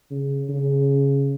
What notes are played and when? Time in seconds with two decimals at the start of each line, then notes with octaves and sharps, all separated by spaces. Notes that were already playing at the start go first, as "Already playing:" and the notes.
0.11 C#3
0.49 C#3